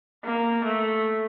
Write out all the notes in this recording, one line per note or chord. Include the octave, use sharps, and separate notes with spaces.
A#3
A3